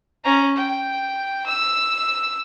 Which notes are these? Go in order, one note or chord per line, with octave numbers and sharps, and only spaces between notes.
C#4 A#5
G5
E6